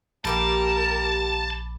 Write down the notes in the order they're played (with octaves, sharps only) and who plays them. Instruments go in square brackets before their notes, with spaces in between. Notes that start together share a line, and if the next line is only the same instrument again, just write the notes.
[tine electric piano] A#1 B5 D6 [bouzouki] G3 A#3 G4 [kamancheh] A#4 [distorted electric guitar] A5